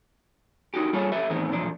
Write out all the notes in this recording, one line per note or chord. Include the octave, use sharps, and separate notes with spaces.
D#4 F#4 G4
G3 A#3 F4 G#4 A4 C#5
G4 A4 B4 E5
E2 A2 D#3 E3 B3 C4
B1 E2 A#2 F3 D4